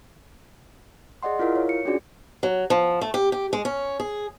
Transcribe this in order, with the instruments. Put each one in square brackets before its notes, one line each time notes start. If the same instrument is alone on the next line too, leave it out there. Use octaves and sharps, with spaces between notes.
[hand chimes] G#4 D5 D#5 F#5 C6
E4 F4 A#4 F5
C#5
C#7
C#4 D4 F4 F#4 G#4 D5
[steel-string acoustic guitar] F#3
F3
A3
G4
G4
G#3
C#4
G#4